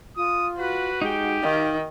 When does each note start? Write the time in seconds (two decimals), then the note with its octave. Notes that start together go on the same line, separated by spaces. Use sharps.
0.17 F4 D#6
0.57 F#4 B4
1.02 G#3 D#4 G4 G5
1.43 D#3 F5